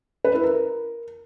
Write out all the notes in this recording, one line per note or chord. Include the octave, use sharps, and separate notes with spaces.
B4
E4
A#4